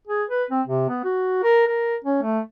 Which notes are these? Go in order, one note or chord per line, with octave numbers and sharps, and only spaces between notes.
G#4
B4
C4
C3
B3
F#4
A#4
A#4
C#4
A3